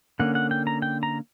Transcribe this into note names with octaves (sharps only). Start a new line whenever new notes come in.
D3 A#3 C#4 F#5
F#5
G5
A#5
G5
A#5